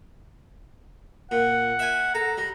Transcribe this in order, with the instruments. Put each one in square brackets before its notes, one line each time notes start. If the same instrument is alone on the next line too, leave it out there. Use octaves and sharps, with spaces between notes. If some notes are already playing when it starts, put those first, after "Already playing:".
[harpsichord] A#2 [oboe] F#5
[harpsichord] E5 G#5
[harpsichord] A4 [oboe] A#5
[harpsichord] G3